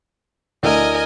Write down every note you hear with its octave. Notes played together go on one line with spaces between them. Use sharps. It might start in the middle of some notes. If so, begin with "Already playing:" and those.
D2 D4 E4 A#4 D#5 G#5